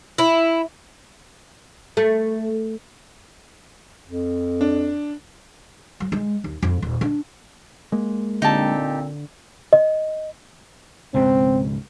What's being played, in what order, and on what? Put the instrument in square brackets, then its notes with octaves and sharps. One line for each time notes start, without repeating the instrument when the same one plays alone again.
[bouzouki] E4
[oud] A3
[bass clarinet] F2
[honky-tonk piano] D4
[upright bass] F#3
G#3
D#2
F2
D#1
D4
[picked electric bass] G#3 A#3
[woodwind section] A#2 C4 [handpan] D3 [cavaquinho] D#4 G4 A5
[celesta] D#5
[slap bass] C#2 G#2 B2 [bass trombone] C4